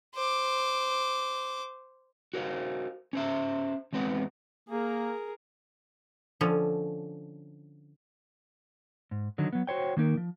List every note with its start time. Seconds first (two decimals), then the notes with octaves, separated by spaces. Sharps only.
0.15 C5 D6
2.33 F#4 A#4 C5 F5
3.13 C#4 C5 E5
3.93 E2 G#3 C4 B4 F#5
4.69 A#3 G#4 A#4
6.41 D3 F3 C#4
9.11 G#2
9.38 D3 D#3 F#3
9.53 F#3 B3
9.67 F#4 C5 C#5 G5
9.97 D#3 A#3 D#4 A#4
10.17 F3